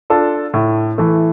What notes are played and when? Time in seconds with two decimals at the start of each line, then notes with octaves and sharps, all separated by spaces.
0.10 D4 F4 A4
0.54 A2
0.98 E3 A3